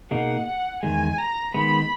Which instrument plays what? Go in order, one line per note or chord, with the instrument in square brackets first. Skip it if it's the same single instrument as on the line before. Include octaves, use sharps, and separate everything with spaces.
[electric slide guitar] B2 A#3 D#4 G#4 [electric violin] F#5
[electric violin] F#5
[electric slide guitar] E2 D#3 G#3 [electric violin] G#5
[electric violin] A#5
[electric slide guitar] D#3 G#3 B3 [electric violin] B5